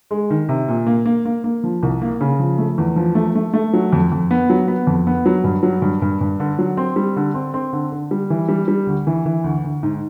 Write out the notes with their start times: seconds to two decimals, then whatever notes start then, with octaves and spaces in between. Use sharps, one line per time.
0.11 G#3
0.30 D#3
0.49 C3
0.68 A#2
0.87 A#3
1.06 A#3
1.25 A#3
1.44 A#3
1.64 F3
1.83 C2
2.02 A#3
2.21 C#3
2.40 F3
2.58 A3
2.78 E2
2.96 F3
3.15 A3
3.35 A3
3.53 A3
3.73 F#3
3.93 F2
4.12 F2
4.31 B3
4.50 F#3
4.68 B3
4.87 F2
5.07 B3
5.26 F#3
5.44 G2
5.63 F#3
5.82 G2
6.02 G2
6.21 G2
6.40 D3
6.59 F#3
6.77 C4
6.96 G3
7.16 D3
7.34 C4
7.54 C4
7.73 D3
7.92 D3
8.11 G3
8.30 E3
8.49 G3
8.68 G3
8.87 D2
9.07 E3
9.25 E3
9.44 D2
9.64 D2
9.83 G#2